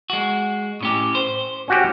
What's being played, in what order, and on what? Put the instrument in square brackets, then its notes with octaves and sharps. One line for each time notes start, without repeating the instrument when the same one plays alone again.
[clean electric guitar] G#3 F#4
A2 C#4 G4
C5
[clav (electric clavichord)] C#4 F#4 G4